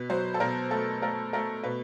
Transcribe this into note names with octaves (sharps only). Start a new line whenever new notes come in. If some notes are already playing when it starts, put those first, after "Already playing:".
Already playing: B2 B4
F#3 C5
A4
B2 A#4
A3 A4
A3 A#4
A3 A#4
B2 B4